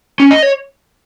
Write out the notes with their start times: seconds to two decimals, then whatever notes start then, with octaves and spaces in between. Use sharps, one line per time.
0.20 C#4
0.31 D#5
0.43 C#5